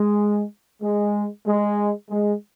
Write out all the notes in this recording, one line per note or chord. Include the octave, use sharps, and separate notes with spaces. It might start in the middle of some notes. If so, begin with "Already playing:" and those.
Already playing: G#3
G#3
G#3
G#3